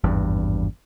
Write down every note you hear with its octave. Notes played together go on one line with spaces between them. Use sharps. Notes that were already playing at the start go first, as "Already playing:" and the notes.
G#1 E2 G2